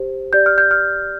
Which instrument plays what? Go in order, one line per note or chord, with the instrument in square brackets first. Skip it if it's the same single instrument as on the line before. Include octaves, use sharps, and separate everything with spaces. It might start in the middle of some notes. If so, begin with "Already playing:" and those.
Already playing: [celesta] G4 C5
G4 D5 G6
F6
G6
F6